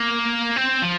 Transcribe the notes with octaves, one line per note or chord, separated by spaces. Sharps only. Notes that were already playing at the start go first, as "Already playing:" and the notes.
Already playing: A#3
C4
F3